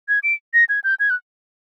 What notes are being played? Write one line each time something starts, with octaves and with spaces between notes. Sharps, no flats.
G#6
D7
A#6
G#6
G6
G#6
F#6